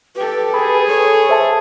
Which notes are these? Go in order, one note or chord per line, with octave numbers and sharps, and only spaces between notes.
G4 A4 B4
G#4 B5
A4 C#5
C5 E5 A5